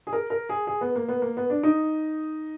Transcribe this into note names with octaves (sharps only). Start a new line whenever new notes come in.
G#4
A#4
A#4
G#4
G#4
B3
A#3
B3
A#3
B3
D4
D#4